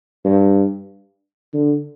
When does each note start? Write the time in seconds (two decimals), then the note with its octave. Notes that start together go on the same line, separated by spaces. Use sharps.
0.24 G2
1.54 D3